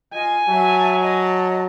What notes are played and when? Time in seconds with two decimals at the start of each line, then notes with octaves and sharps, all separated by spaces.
0.14 F4 D#5 G#5
0.48 F#3 E5 A5
1.01 D#5 A5